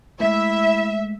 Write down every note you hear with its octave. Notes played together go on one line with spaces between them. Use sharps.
G#3 A3 E4 E5